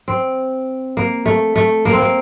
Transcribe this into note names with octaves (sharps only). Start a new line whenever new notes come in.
C4
A#3
A3
A3
A#3
C4
A#3